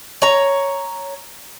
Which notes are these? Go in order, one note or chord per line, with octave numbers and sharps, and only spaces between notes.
C#5 A#5